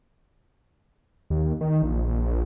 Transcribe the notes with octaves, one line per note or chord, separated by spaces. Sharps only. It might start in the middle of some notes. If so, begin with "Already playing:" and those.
D#2
D#3
A#1